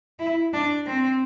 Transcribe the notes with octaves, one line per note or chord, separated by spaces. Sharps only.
E4
D4
C4